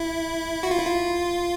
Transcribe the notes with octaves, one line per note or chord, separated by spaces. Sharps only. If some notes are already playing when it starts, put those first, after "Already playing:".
Already playing: E4
F#4
F4
E4
F4